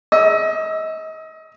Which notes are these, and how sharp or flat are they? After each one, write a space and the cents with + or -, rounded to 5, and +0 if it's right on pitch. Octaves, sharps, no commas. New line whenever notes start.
D#5 +30 E6 +0